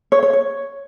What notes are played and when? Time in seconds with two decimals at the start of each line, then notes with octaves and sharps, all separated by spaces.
0.12 C#5
0.23 C#5
0.33 C#5